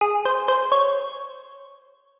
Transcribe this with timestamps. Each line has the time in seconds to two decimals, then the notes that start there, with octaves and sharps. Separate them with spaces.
0.01 G#4
0.25 C5
0.48 C5
0.72 C#5